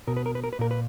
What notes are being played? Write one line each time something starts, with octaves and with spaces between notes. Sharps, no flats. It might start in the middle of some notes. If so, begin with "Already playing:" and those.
B2 A#4
B4
A#4
B4
A#4
B4
A#2 A#4
B4